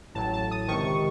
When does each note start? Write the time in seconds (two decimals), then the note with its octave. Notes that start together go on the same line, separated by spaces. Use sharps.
0.14 A1 A2 F#3 A5
0.33 A5
0.51 D#6
0.68 C#2 C3 D#3 C#6